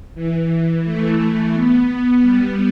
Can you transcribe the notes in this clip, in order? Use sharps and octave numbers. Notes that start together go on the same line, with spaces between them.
E3
A3
B3
G3